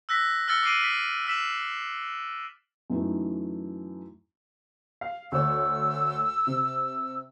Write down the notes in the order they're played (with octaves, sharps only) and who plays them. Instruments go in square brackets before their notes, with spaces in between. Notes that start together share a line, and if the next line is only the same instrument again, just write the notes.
[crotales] E6 F#6 A#6 B6
E6 F6 A6 C#7 G7
D6 F6 C7 D7 D#7 F#7
F6 B6
E6 B6 E7 F#7
[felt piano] F#2 E3 A3 D#4
[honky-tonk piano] F5
[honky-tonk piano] D2 C#5 [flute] E6
[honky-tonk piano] C3